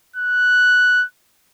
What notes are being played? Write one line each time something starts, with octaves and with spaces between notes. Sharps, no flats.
F#6